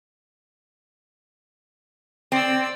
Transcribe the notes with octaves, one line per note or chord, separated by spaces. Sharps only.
C4 D5 E6